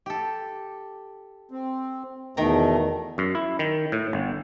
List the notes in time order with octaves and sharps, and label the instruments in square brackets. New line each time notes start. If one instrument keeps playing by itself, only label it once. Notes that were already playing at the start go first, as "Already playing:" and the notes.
[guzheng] G4 A4
[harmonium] C4
[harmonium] E2 B2 A3 [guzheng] D#3 G5 A#5
[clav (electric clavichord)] F#2
E4
D#3
A2
G1